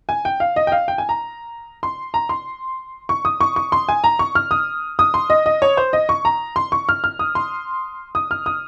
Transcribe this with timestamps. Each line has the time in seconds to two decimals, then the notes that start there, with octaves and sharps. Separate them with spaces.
0.09 G#5
0.25 G5
0.40 F5
0.56 D#5
0.67 G5
0.72 F5
0.88 G5
0.98 G#5
1.09 A#5
1.83 C6
2.14 A#5
2.29 C6
3.09 C#6
3.25 D#6
3.41 C#6
3.56 C#6
3.72 C6
3.89 G#5
4.04 A#5
4.19 C#6
4.35 F6
4.51 D#6
4.99 D#6
5.14 C6
5.30 D#5
5.46 D#5
5.62 C#5
5.77 C5
5.93 D#5
6.09 C#6
6.25 A#5
6.56 C6
6.72 C#6
6.89 F6
7.04 F6
7.19 D#6
7.35 C6
8.15 D#6
8.31 F6
8.46 D#6